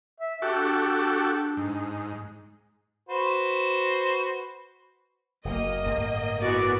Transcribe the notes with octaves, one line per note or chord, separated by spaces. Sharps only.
E5
D4 F#4 G4 A4
G#2
F#4 B4 C5
F#1 A#3 D#5
G1 A2 A3
E3 A#3 B3 F#4 D5